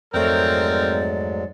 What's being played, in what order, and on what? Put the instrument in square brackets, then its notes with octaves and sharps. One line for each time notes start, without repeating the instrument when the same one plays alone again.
[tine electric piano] F2 A3 [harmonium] G#2 F#3 G#3 [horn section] C4 A#4 [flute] D5